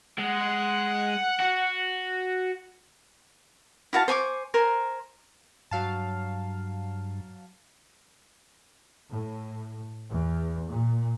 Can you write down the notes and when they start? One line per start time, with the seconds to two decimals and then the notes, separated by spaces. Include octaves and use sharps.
0.18 G#3 F#5
1.40 F#4
3.93 E4 F#4 F5 A5
4.08 C5 G#5 C#6 D6
4.54 A#4 C5 G#5
5.71 G2 F#3 F5 A5
9.11 A2
10.10 E2
10.70 A#2